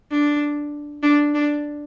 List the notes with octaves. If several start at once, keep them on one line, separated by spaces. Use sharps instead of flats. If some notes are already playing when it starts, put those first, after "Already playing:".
D4
D4
D4